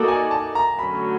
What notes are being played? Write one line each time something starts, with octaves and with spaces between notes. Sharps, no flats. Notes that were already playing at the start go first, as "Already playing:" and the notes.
Already playing: A#3 D#4 F#4 A4 D5
G#5
A5
A#5
D3 F#3 A3 C#4 B5